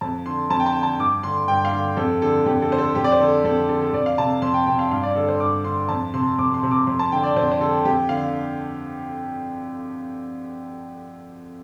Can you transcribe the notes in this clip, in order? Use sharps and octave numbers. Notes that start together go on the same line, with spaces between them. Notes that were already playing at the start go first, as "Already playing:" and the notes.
F2 A5
D3 C6
F2 A5
G5
A5
D3
A5
G2 D6
D3 C6
G2 G5
F5
D3
F2 A4
D3 A4
F2 G4
A4
D3 C5
A4
F2 G4
D5
C5
D3 A4
F2 A4
D3 A4
A4
F2 D5
F5
C3 A5
F2 C6
G5
C3 G5
F5
G2 F5
D5
D3 A4
C5
G2 D6
D3 C6
F2 A5
C3 C6
F2 D6
C6
C3
D6
F2 C6
A5
D3 G5
D5
F2 C5
C5
D3 A4
F2 G4
D3 F5